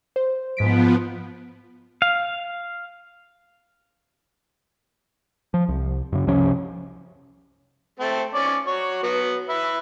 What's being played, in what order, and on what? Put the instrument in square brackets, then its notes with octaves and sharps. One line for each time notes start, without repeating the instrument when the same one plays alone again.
[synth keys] C5
[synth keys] G#2 B6 D7 [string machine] F3 B3
[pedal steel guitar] F5
[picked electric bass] F3
C2
F#2 C#3
C2 C3 F3 C#4
[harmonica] A3 C4 A4
C#4 C#5 D5
F#4 C#5
F#3 B3
B4 E5